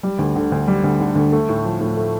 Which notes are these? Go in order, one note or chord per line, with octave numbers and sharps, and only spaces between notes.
G3
D2
D3
D2
G3
D2
D3
D2
A3
A2
F3
A2
A3